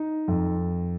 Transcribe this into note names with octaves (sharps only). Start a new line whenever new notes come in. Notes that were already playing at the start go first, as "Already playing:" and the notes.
Already playing: D#4
F2